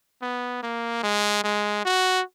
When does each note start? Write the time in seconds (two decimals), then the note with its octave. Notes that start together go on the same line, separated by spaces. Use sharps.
0.22 B3
0.63 A#3
1.03 G#3
1.44 G#3
1.85 F#4